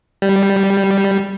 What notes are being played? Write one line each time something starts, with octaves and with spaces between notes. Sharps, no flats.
G3